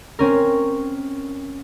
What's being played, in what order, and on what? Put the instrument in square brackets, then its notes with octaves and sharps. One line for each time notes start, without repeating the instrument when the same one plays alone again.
[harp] C4 C#4 A#4